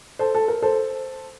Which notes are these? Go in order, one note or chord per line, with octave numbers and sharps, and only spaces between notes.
A4 C5
A4
A#4
A4 C5